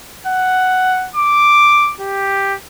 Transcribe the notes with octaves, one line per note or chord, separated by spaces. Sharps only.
F#5
D6
G4